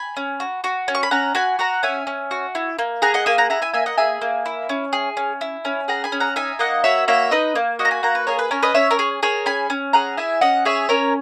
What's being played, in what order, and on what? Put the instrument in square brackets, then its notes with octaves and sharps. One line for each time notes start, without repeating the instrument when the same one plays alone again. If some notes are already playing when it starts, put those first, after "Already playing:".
Already playing: [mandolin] G#5 B5
C#4
F#4
F#4
C#4
C#6
B5
C#4 F#5 A#5
F#4 G#5 B5
F#4 F#5 A#5
C#4 E5 G#5
C#4
F#4
E4
A#3
G#4 F#5 A#5
D#5 F#5
A#3 E5 G#5
F#5 A#5
E4 F#5 A#5
E5 G#5
A#3 E5 G#5
D#5 F#5
G#4 E5 G#5
A#3
E4
C#4
G#4
C#4
E4
C#4
G#4 F#5 A#5
G#5 B5
C#4
F#5 A#5
D#4 E5 G#5
A#3 D#5 F#5
F#4 C#5 E5
A#3 C#5 E5
D#4 B4 D#5
A#3
F#4 D#5 F#5
A#5
G#5 B5
A#3 F#5 A#5
B4
G#4 A#4 C#5
B4
C#4 A#4 C#5
B4 D#5
C#4 C#5 E5
A#4 C#5
G#4
G#4 A#4 C#5
C#4 G#5 B5
C#4
G#4 F#5 A#5
E4 E5 G#5
C#4 D#5 F#5
G#4 C#5 E5
C#4 A#4 C#5